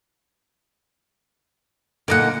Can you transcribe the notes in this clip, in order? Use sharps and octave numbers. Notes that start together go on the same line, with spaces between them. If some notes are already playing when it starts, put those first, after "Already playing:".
A#2 D3 A#3 D#4 F#5